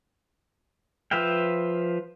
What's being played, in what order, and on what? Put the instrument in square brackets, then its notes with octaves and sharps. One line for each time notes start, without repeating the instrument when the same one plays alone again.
[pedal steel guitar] F3 B4 E5 F5 G5